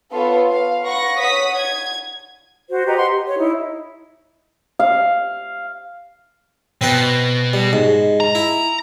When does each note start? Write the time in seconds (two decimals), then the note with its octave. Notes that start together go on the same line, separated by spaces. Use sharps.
0.13 B3 F4 A4 C#5
0.50 F5
0.84 B4 F#5 C#6 A#6
1.19 C#5 F#5 D#6 B6
1.56 G#6
2.69 F#4 C5
2.86 G4 B4 D#5 A#5
2.97 F#5 C6
3.11 G4
3.26 C#5
3.38 D#4 E4
4.79 F5
6.81 B2 C4 B4 G5
7.53 G3
7.73 G#2
8.20 A#5
8.35 E4